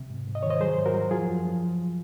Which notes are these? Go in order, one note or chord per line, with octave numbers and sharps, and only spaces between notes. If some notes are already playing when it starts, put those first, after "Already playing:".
Already playing: C3
G#2
G#2
D#5
D#3 C#5
C5 D#5
F#3 G#4 C5
G#2
F#4 A#4
F#3
F3 F4 G#4
F#2
F3